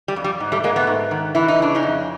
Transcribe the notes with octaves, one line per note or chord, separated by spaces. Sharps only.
G3
F2
G3
G#2
G3 A3
G#2 G#3 A#3
A3 B3
G#2
D#3
E3 E4
D#4
C#3 D4
C#4 D#4
F2